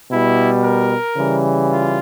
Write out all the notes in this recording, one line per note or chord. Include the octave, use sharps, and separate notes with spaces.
B2 G3 E4
A#4
C#3 E3 G3
F4